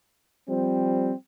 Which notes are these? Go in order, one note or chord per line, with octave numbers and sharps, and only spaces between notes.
F3 G3 C4